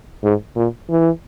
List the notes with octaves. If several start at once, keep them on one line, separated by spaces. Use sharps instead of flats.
G#2
A#2
E3